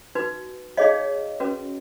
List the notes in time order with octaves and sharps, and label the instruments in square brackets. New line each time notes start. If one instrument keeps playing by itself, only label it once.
[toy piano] D#4 F#4 B4
D#4 G#4 C#5 D#5 F5
C#4 F#4 B4